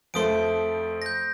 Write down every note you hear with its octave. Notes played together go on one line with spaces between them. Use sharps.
F2 F3 A3 C6 D#6 D7
G6 A#6